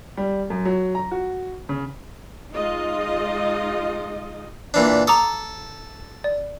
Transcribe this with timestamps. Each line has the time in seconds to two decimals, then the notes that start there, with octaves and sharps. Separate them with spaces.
0.17 G3
0.50 F#2
0.65 F#3
0.95 A#5
1.11 F#4
1.69 C#3
2.54 G#3 D#4 F4 D#5
4.74 A#2 E3 D4
5.07 A4 A#5 D6 D#6
6.24 D5